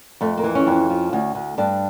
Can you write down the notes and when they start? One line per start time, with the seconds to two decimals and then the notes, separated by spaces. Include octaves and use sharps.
0.21 F2 A3
0.37 A#3
0.44 E3
0.55 C#4
0.67 F2 C#4
0.90 F3
1.13 D2
1.35 D2
1.58 G2 D4